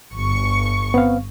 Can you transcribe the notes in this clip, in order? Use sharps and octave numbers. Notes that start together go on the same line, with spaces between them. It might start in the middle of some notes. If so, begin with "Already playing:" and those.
G1 C#6
B3 C4 F5